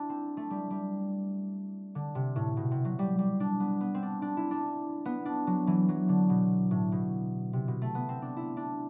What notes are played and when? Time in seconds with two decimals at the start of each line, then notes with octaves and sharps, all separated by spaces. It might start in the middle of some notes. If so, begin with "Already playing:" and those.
Already playing: D4 E4
0.09 C4
0.37 A3
0.51 G3
0.70 G3
1.95 D3
2.15 C3
2.36 A2
2.57 B2
2.71 C3
2.85 F#3
2.99 G3
3.19 G3
3.40 D4
3.60 B3
3.81 B3
3.94 C4
4.03 D4
4.22 D4
4.37 E4
4.51 D4
5.05 B3
5.25 D4
5.47 F#3
5.67 E3
5.89 F#3
6.09 D3
6.30 B2
6.71 A2
6.92 B2
7.53 C3
7.68 B2
7.82 A3
7.95 B3
8.09 C4
8.22 D4
8.37 E4
8.57 D4